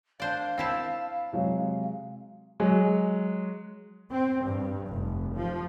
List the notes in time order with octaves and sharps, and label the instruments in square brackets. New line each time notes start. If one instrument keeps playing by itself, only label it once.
[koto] D4 C5 D5 [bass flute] F5
[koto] C4 E4 A5 [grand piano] C7 E7
[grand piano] C3 F#3 G#3
F#3 G#3
[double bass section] C4
G2
F1
F3